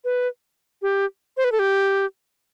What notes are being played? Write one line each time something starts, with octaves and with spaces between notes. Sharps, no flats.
B4
G4
C5
B4
A4
G4